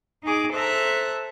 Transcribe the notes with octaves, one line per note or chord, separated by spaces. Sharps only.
D#4 G#4 D6
A4 C5 E5 A#5 F#6